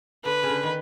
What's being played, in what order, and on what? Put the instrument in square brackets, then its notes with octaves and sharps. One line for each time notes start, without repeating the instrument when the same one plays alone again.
[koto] D3 [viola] B4
[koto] C#3
D3
D#3